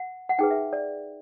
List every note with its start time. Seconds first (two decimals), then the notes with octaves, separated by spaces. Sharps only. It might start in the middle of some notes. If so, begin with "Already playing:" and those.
Already playing: F#5
0.29 F#5
0.38 D#4 G#4 B4 G5
0.51 E5
0.73 D5